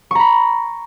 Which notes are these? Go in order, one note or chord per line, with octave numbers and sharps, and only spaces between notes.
A#5 B5 C#6